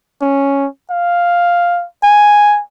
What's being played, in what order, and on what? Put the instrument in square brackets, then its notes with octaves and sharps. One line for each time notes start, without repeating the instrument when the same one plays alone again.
[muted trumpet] C#4
F5
G#5